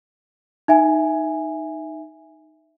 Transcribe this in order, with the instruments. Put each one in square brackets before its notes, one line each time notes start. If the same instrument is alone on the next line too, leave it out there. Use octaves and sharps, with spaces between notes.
[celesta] D#4 E5 G#5